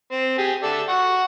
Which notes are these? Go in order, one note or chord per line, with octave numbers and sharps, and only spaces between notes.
C4
G4 G#4
A4 D5 E5
F#5 C#6